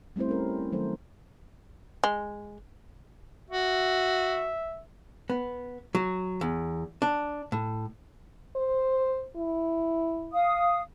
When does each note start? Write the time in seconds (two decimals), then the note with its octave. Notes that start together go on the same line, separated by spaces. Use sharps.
0.16 G3 A3 C4 E4 C5
0.29 C#4 A#4
0.72 D#3 F#3 A3 A4 C5
2.04 G#3
3.50 F#4 E5
5.30 B3
5.95 F#3
6.41 E2
7.02 D4
7.52 A2
8.56 C5
9.36 E4
10.32 F5 D#6